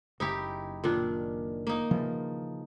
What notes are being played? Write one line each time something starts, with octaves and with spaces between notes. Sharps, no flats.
F#1 D#4 E4 G4
A#2 D#3 D4
A#3 D#4
C#3 E3 F3